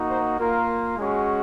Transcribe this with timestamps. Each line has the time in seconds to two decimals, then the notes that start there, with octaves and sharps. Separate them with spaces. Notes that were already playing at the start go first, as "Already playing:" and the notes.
Already playing: A#3 D#4 F#4
0.09 C5
0.38 A#3 F4 A#4
0.96 G#3 C#4 F#4